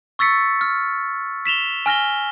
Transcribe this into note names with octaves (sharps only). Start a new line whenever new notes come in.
C#6 E6 A6 B6 C#7
F6
B6 E7 F7 G7
G#5 F6 A#6 G7